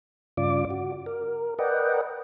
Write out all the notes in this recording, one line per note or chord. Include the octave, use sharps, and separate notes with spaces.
G2 C#3 F4 D5 D6
F#4
A#4
A#4 B4 D5 D#5 F#5 G5